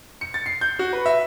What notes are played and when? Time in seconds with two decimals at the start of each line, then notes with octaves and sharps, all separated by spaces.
0.21 C#7
0.34 A6
0.46 C7
0.61 G6
0.79 F#4
0.93 B4
1.06 E5